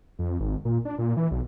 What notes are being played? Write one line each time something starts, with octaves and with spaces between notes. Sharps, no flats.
F2
G#1
A#2
D4
A#2
E3
B1